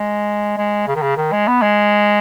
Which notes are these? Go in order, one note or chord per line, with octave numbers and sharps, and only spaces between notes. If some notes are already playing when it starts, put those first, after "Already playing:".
Already playing: G#3
G#3
C#3
D#3
C#3
D#3
G#3
B3
G#3